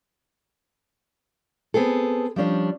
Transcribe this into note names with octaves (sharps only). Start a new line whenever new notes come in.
B3 C4 G#4 A4
F3 G3 C#4 D4